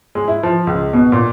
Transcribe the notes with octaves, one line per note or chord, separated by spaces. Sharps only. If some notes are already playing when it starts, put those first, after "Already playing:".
G#3
E4
F3
C#2
B2
A#2